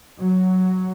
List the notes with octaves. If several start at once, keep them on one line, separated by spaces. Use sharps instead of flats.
F#3